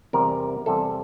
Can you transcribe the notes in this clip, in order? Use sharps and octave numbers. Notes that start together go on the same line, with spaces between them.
E2 C3 G3 A#4
E2 C3 G3 A4